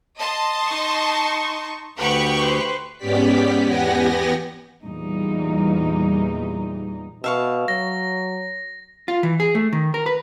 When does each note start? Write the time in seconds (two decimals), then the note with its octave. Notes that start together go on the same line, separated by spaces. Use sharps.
0.19 D#5 A5 C6
0.67 D#4 C#6
1.98 D2 G4 B4 F#5 C#6
2.37 B4 C5
2.98 G#2 B3 C#4 G4 D5 B6
3.65 E2 B3 G4 F#5 G#5 A#6
4.83 E2 A#2 E3 G3 D#4
7.24 B2 E5 F5 C#6
7.68 F#3 A#6
9.08 F4
9.23 E3
9.40 G#4
9.55 A3
9.73 D#3
9.94 A#4
10.06 B4